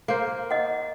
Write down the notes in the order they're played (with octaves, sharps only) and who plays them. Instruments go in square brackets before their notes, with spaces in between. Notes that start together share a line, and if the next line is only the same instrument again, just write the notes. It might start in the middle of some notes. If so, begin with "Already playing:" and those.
[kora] A#3 C5
[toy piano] D#5 F#5